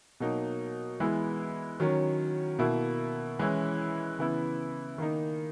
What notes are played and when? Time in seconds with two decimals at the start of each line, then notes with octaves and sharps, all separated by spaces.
0.20 B2 F#3 A#3 D#4
1.00 E3 G#3 B3 E4
1.80 D#3 F#3 C#4
2.59 B2 A#3 E4
3.39 E3 G#3 C#4 E4
4.18 C#3 E3 B3 E4
4.98 D#3 A#3 D#4